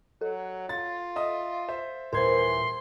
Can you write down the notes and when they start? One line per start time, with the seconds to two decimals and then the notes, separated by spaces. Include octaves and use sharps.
0.21 F#3 A4
0.69 F4 A6
1.16 D#5 E5 D#6
1.68 C5 E5
2.13 D#1 E3 A#4 C5 C6 G#6